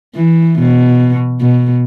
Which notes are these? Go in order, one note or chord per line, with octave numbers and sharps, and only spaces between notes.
E3
B2
B2